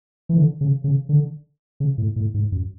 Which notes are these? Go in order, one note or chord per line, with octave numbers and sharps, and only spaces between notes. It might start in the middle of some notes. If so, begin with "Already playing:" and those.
E3
D3
C#3
C#3
D3
C#3
A2
A2
G#2
F#2